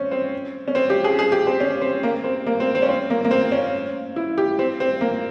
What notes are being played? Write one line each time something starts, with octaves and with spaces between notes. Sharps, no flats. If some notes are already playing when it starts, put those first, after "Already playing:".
Already playing: C4 C#4
C4
C#4
C4
G4
G#4
G#4
G4
C4
C#4
C4
A#3
C4
A#3
C4
C4
C#4
C4
A#3
A#3
C4
C#4
E4
G4
C4
C4
A#3